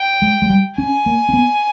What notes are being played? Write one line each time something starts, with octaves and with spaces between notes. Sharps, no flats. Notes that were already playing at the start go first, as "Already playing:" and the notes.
Already playing: G5
G#3
G#3
G3
C#4 G#5
A#3
C4
B3